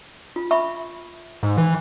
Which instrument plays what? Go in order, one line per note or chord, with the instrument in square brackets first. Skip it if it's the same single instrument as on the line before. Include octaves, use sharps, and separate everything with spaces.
[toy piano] F4
E5 B5 C#6
[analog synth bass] G#2
E3